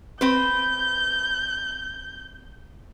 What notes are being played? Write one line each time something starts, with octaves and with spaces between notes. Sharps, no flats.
C4 B4 G6